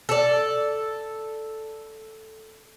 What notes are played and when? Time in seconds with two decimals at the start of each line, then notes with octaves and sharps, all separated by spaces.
0.09 A4 D5